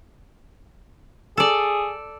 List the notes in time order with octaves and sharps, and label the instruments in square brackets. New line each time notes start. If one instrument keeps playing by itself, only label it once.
[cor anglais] G#4 [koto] A4 D5